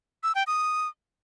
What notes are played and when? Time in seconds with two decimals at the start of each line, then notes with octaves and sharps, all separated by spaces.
0.23 E6
0.35 G5
0.47 D#6